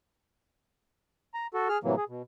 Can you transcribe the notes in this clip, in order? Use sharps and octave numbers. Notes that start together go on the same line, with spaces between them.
A#5
F#4 A4
G#4 F6
A2 C3 E3 F#3 A#3
G#4
B2